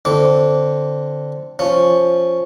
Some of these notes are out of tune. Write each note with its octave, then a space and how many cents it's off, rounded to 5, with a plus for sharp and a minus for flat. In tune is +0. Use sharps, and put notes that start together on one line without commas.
D3 +0 C4 +0 D6 -20
F3 +0 C#4 +0